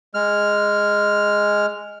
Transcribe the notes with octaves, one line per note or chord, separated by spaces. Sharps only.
G#3 F6